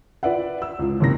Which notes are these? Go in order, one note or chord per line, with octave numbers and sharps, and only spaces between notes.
F4 B4 D5 E5 F#5
E6
C#2 F4
F#1 C3 A#3 A#6